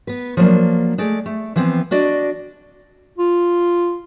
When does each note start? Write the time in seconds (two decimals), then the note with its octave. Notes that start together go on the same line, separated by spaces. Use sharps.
0.07 B3 B4
0.37 F3 F#3 A#3 D4
0.98 G#3 A3 D5
1.26 A3
1.56 E3 F3 B3 C4
1.91 D4 F#4 D5 D#5
3.18 F4